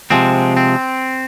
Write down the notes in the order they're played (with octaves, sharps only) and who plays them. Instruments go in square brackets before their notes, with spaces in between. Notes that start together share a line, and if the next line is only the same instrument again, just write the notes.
[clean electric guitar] C3 F3 G#3 C4
C4